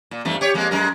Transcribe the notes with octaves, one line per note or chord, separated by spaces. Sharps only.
A#2
E2 G2 A3
G4 C#5
F2 G#3 A#3
F#2 G#3 A#4